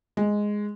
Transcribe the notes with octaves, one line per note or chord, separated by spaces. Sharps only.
G#3